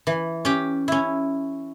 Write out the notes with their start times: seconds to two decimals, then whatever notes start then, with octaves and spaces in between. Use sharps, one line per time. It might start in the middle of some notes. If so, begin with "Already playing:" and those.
0.07 E3
0.45 C#4 G4
0.88 C#4 E4